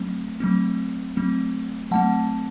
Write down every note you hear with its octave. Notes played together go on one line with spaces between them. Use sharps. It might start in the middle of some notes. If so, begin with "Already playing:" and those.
Already playing: F#3 A3 C4
F#3 A3 C4
F#3 A3 C4
F#3 A3 C4 F#5 A5